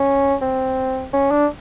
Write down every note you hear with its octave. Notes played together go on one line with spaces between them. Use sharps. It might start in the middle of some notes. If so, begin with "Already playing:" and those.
Already playing: C#4
C4
C#4
D4